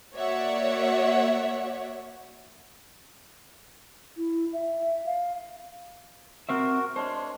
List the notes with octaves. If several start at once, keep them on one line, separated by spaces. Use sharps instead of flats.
A#3 F#4 C#5 D5 E5 F#5
E4
E5
F5
C4 F#4 A#4 C5 E5
G#3 D4 C5 C#5